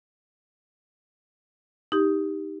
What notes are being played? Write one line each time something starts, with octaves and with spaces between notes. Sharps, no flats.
D#4 G4